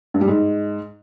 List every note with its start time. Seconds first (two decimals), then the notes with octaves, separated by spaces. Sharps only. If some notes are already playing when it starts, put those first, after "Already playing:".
0.14 G2
0.21 G3
0.28 G#2